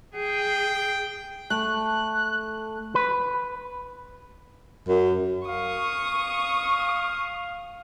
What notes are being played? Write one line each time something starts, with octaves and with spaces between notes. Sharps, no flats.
G#4 G5
A3 F#6
B4
F#2
F5 C#6 D#6